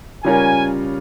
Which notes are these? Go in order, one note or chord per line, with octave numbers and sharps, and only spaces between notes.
C#3 G3 C#4 F4 A#4 G#5